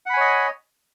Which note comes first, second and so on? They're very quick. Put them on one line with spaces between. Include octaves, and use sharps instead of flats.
F#5 B5 G#5 C#5 D#5